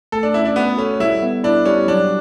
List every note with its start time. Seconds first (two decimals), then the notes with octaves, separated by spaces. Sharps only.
0.12 A3 A4
0.23 D4
0.34 C#4 E4
0.45 D4
0.56 B3 F#4
0.77 C#4 A4
1.00 G3 E4
1.22 B3
1.44 D4 E4
1.66 G3 C#4
1.88 F#3 D4